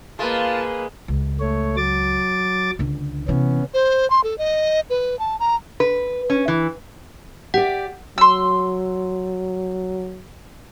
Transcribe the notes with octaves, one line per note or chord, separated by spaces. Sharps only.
G#3 A#3 F4 B4 A5
C#2
A3 C#5
F#3 D6 A6
C#2 D3
C3 E3 B3 C#4
C5
C6
A4
D#5
B4
A5
A#5
B4
C#4
E3
G4 D5 F#5
F#3 C6 E6